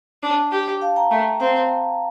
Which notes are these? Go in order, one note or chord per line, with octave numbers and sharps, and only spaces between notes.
D4
G4
F5 A5
G5 A#5
A3
C4 F5 A5